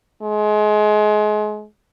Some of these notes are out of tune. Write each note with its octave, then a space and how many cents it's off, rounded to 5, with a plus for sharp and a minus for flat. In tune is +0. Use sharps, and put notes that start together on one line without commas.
G#3 +30